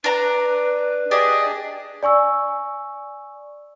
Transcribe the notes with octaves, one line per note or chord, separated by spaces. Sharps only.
D4 B4 A#5
D4 G4 G#4 D5 D#5
D5 G#5 C#6 E6